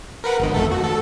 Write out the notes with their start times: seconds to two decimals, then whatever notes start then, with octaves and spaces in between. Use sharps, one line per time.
0.24 A#4 B4 F#5
0.39 G#1 D#3
0.54 F2 A3 A4
0.71 F#4
0.84 A4